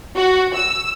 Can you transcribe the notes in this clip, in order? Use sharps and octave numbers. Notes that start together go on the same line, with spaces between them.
F#4
E6